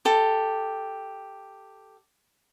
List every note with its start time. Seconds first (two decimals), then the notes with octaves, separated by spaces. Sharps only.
0.05 G4 A4